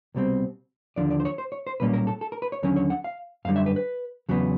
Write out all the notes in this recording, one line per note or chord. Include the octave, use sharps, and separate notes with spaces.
C2 B2 G3 C4
D#2 D3 F3 D5
D5
C5
C#5
C5
C#5
C5
B1 A#2 G3 A#3 C#4 B4
A#4
A4
A4
A#4
B4
C#5
D#2 D3 F#3 C#4 C#5
C#5
F#5
F5
F#2 D3 G3 F5
E5
B4
B4
E2 C#3 F#3 B3